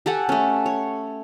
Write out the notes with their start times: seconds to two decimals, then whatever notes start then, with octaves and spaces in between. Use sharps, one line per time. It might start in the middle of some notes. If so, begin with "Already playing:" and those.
0.06 G4 A4 F#5 G#5
0.29 A3 C#4
0.66 C#5